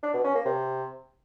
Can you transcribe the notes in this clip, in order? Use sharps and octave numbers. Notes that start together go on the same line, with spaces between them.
D4
B2
C#4
A#3
C3